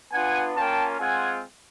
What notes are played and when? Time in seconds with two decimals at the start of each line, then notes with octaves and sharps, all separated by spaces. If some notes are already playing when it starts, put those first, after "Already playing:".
0.12 B3 D4 F4 F#5 G#5
0.56 A#3 C#4 F4 G5 A5
0.99 G#3 C4 F4 F#5 G#5